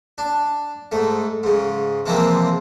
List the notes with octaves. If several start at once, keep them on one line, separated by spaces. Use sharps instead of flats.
D4
G#2 A3
G#2 C#3
C3 E3 F3 G#3 A#3 C4